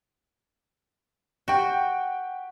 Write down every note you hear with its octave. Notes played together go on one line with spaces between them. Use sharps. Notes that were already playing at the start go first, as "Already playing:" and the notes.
F#4 G4 G5